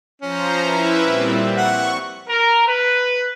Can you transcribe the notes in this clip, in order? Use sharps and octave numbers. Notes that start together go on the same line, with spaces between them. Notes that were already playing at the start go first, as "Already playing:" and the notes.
F3 C#4 C5 A#5
E4 B4 E5
A#2 G3 C4
F#5 C#6
A#4
B4